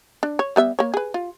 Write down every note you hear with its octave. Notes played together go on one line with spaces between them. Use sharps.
D4
C#5
G3 B3 E5
A#3 C#5
G#4 B4
F4